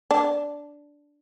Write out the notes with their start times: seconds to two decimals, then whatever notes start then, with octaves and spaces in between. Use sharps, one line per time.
0.11 D4